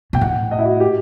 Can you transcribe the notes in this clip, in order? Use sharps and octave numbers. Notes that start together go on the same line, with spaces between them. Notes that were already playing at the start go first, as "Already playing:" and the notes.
B2 G5
A2 F#5
D#5
E4
F#4
G4